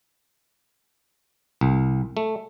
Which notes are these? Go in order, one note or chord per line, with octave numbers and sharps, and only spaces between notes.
C2
A3